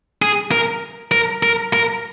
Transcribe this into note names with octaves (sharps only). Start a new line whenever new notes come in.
G#4
A#4
A#4
A#4
A#4